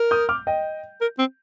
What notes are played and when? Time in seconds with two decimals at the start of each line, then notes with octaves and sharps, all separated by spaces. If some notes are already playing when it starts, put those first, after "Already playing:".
Already playing: A#4
0.11 D#6 G6
0.29 D6 F6
0.47 D#5 G5
1.01 A#4
1.19 C4